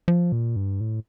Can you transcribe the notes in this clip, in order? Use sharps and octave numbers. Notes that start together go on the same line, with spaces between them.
F3
A#2
G2
A2